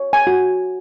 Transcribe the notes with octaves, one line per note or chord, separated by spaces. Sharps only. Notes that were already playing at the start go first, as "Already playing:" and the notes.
Already playing: C#5
G#5
F#4